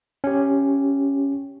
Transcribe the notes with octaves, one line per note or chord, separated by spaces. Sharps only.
C#4 G4